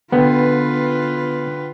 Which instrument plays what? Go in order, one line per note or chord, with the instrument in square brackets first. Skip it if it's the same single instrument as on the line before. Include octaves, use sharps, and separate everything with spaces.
[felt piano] D3 G5 [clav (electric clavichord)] B3 [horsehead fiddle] F4 B4